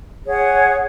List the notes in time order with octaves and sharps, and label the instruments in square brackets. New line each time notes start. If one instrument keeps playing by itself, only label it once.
[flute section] G#4 C#5 F#5